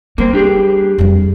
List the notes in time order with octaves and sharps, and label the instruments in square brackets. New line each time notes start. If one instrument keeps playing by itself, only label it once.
[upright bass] G3 [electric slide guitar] A#3 C4
[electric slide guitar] D4 G4 G#4
[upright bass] F2 G3